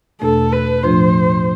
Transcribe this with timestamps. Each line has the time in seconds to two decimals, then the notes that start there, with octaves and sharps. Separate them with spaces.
0.21 E2 B2 A3 D4 A4
0.52 B4
0.83 A2 F3 A3 D4 F4 C5